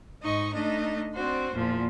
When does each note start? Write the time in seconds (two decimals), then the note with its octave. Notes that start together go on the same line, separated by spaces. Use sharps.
0.21 G#2 D#4 D#5 C#6
0.53 A3 D4 D#4 D#5
1.13 C4 D4 F#4 C5
1.51 E2 A#2 F3